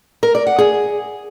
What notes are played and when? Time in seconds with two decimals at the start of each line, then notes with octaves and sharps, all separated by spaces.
0.23 A#4
0.35 D5
0.47 F#5
0.59 G#4